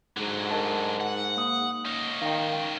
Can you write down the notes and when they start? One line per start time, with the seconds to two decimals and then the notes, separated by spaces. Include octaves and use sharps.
0.17 G#2 D3 F#3
0.50 A#4 D#5 A5
1.01 F#5
1.37 A#3 D#6
1.85 C#4 D#4
2.22 D#3 F5 G5